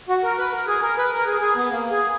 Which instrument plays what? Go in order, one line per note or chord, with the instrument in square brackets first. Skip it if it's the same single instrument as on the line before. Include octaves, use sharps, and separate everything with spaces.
[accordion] F#4
A#4
B4
A#4
G#4
A#4
B4
A#4
G#4
G#4
B3
A#3
G#4